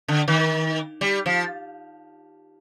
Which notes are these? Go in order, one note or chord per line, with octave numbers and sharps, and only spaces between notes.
D3
D#3
G3
F3